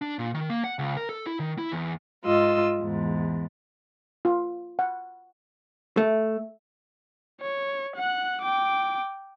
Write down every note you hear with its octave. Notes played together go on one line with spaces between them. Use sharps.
D4
A#2
D#3
A#3
F#5
C#2
A#4
A4
E4
D#3
E4
E2
G#2 F4 D#5 E6
E2 G#2
F4
F#5
A3
C#5
F#5 F#6
G5 D6